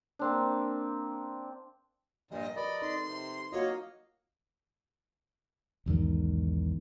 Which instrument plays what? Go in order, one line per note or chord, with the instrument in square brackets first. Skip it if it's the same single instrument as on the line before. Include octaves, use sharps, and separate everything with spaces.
[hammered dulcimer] A#3 C4 D4
[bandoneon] G2 A#2 [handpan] F3 G4 [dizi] D#5
[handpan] A#4 B4 [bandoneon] D5 D#5 [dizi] B5
[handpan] C4 D#4 A4 [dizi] C6
[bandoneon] C3
[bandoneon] A#3 D#5 [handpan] F4 F#4 F5 [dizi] C#5
[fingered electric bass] B1 E2 G#2 D#3